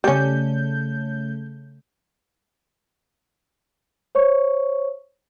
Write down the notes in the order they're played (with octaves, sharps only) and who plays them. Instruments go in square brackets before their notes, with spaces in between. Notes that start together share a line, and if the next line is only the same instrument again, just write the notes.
[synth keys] C#3 A3 G6 [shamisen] G3 C#4
[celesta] C5 C#5 C#6